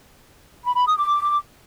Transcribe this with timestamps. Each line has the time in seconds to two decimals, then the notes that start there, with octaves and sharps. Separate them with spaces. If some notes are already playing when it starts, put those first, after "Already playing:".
0.64 B5
0.75 B5
0.87 D#6
0.98 D6